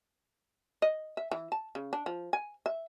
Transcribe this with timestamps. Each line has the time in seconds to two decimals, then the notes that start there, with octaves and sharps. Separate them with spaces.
0.82 D#5
1.17 E5
1.31 E3
1.52 A5
1.75 C#3
1.93 D4
2.06 F3
2.33 G#5
2.66 E5